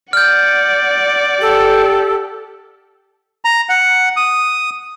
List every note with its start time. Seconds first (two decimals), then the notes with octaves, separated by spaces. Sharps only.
0.13 D5 F#5 F6 G6
1.41 G4 A4
3.45 A#5
3.69 F#5
4.16 D#6